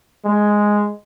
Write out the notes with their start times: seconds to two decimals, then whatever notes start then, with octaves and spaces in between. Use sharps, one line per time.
0.24 G#3